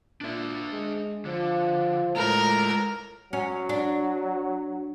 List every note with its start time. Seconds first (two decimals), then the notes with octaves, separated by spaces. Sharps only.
0.21 A#2 D4 E5
0.72 G#3
1.25 D3 F3
2.16 A2 G#3 F4 A#4
3.33 F#3 C#4
3.69 D4